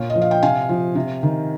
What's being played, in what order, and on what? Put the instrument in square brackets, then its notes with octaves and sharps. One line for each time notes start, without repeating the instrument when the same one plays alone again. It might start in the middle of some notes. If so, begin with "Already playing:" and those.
Already playing: [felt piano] A#2 C#5 F5
D#5
F3
F5
G5
C3 F5 G#5
F3
C3
D#3